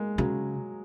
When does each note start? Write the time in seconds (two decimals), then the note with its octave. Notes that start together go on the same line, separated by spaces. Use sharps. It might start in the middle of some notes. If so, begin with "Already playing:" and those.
Already playing: G#3 A#3
0.18 C#3 F#3